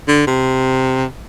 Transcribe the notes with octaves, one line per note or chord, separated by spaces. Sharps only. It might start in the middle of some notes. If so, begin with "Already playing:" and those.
D3
C3